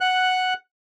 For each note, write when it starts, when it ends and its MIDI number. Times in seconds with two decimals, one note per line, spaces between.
0.01 0.54 78
0.01 0.54 90